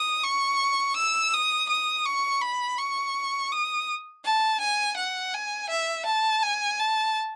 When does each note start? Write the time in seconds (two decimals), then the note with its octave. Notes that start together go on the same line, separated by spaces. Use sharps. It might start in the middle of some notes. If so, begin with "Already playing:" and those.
Already playing: D#6
0.24 C#6
0.97 E6
1.34 D#6
1.69 D#6
2.06 C#6
2.42 B5
2.78 C#6
3.52 D#6
4.25 A5
4.61 G#5
4.97 F#5
5.34 G#5
5.70 E5
6.06 A5
6.43 G#5
6.80 A5